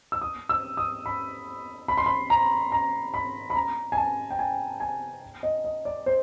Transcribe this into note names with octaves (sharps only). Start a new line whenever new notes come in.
E6
D#6
E6
D#6
B5
B5
C6
B5
A#5
A#5
B5
B5
A#5
G#5
A5
G5
G#5
G#5
D#5
D#5
D5
C5